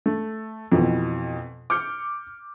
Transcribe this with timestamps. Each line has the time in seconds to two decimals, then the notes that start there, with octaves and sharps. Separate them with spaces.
0.06 A3
0.72 F2 B2 E3
1.70 D6 F6 G6 C#7